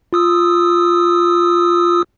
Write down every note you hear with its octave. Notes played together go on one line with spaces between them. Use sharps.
F4 D#6 E6